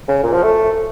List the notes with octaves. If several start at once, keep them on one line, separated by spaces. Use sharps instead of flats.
C#3
A#2
F3
A3